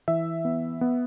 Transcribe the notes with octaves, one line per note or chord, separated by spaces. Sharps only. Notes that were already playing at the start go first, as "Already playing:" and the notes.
E3 E5
B3
B3